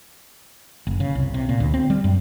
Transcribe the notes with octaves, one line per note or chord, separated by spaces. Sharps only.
F#1
C#3
C2
C3
A#2
D2
C4
G3
F#2